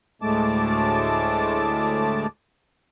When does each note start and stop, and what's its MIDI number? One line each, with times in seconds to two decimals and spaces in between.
0.22 2.27 38
0.22 2.27 45
0.22 2.27 56
0.22 2.27 57
0.22 2.27 81
0.22 2.27 86